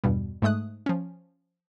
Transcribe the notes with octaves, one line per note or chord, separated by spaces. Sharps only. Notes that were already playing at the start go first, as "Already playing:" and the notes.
E2 G2 B2 G3
G#2 G#3 A3 D#6 F#6
F3 C#4